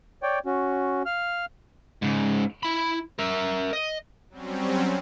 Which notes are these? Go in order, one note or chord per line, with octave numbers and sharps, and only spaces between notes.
C#5 D5 G5
C#4 F#4
F5 F6
G#2 C#3
E4 B5
A#4 E5
D#5
F#3 G3 C4 C#4